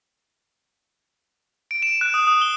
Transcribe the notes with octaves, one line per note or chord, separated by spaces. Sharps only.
D7
E7
F#6
D#6
D#6
G7